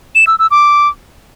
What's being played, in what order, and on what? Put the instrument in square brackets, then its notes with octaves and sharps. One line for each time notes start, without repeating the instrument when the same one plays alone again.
[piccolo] E7
E6
E6
D6